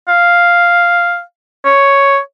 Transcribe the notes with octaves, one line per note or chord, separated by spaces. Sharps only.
F5
C#5